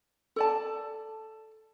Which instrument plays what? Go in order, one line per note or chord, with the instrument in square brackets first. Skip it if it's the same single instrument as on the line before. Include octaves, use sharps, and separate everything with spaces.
[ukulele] A4 D5 A5